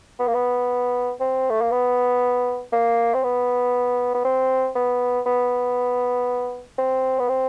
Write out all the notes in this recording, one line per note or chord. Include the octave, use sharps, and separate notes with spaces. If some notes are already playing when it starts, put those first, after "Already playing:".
B3
A#3
B3
C4
A3
A#3
B3
A#3
C4
B3
B3
C4
B3
B3
C4
B3
C4